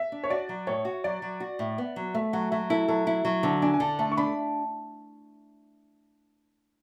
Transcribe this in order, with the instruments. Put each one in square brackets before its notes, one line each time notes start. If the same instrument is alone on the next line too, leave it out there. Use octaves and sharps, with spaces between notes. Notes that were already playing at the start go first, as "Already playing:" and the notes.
Already playing: [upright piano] E5
[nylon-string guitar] D4
[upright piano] C#5
[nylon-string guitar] F#4 [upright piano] D5
[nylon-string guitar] F#3
[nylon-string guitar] A2 [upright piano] C#5
[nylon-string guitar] F#4
[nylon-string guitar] F#3 [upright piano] D5
[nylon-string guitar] F#3
F#4
A2
B3
F#3
[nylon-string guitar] A3 [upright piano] E5
[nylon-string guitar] F#3 [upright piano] F#5
[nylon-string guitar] F#3 [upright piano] E5
[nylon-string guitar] E4 [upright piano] A4
[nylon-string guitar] F#3 [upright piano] A4
[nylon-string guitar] E4
F#3
D3
[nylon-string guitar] D4 [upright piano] G#5
[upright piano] G#5
[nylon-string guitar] D3 [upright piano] A5
[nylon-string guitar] A3 [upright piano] A5
[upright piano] C#6
[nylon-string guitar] D4 [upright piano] B5